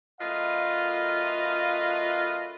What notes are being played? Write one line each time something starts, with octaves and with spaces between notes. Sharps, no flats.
F#2 A3 F4 B4 D#5 F5